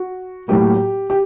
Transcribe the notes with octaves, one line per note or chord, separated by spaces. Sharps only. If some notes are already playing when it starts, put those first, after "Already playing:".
Already playing: F#4
A2 F#3 A#3 G4
G4